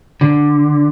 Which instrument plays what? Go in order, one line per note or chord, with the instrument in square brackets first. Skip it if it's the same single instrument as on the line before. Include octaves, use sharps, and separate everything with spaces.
[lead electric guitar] D3